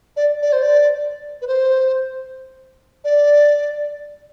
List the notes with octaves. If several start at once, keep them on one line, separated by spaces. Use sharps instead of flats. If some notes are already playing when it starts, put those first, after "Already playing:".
D5
D5
C5
D5
B4
C5
D5